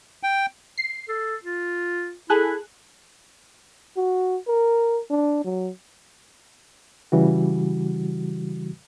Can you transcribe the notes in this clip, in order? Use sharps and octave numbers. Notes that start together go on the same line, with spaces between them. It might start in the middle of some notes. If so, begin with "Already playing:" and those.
G5
C7
A4
F4
E4 G#4 A4 F#6
F#4
A#4
D4
F#3
C#3 E3 G3 F#4